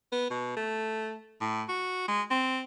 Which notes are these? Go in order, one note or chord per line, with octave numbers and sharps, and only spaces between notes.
B3
B2
A3
A2
F#4
G#3
C4